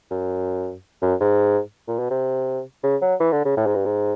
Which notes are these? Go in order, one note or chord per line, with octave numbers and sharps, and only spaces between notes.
F#2
F#2
G#2
A#2
B2
C3
C#3
F#3
E3
D3
C#3
A2
G#2
G2
G#2